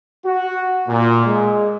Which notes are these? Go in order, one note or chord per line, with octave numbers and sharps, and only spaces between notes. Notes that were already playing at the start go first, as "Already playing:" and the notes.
F#4
A#2
G#3